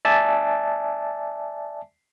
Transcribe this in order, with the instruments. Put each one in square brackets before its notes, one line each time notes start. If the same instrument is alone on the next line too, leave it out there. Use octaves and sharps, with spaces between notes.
[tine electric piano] D5 E5 G#5 A5